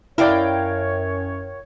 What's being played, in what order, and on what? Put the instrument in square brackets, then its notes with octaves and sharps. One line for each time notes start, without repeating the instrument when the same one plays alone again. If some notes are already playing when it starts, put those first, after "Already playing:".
[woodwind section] F#2 C#5 [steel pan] E4 D5 [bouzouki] A#4 F5 G5